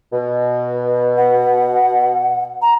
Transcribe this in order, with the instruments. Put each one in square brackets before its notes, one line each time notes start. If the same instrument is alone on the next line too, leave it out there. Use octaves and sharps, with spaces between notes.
[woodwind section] B2
[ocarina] F#5
A#5